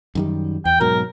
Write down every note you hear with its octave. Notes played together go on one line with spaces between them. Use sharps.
F#2 D#3 G3
E2 G5
G#2 B2 F#3 A#4